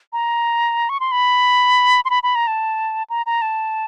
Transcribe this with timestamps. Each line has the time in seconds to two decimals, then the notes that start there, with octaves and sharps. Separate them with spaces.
0.13 A#5
0.89 C#6
1.00 C6
1.12 B5
2.05 C6
2.10 B5
2.23 B5
2.35 A#5
2.47 A5
3.10 A#5
3.26 A#5
3.42 A5